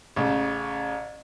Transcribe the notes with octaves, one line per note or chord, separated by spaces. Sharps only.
A1 C#3